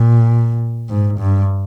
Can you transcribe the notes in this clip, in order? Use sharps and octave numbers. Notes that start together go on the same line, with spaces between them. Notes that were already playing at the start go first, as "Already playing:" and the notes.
Already playing: A#2
G#2
G2